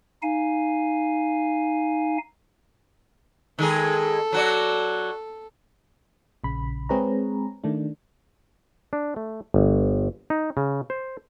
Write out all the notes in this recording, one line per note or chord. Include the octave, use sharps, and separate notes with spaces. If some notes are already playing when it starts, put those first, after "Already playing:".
D#4 F5 G#5
D#3 G#3 G#4 A4
F#3 F#4 D5
A#1 C#3 B5
G#3 C4 G#4 B4 C#5 A#5
D#3 A3 D4
D4
A3
G1
D#4
C#3
C5